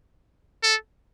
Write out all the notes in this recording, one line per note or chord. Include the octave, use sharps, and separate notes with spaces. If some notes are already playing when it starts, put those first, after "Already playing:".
A4